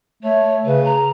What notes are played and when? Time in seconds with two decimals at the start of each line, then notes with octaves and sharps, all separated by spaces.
0.23 A3 C#5
0.65 C#3 B4
0.84 A#5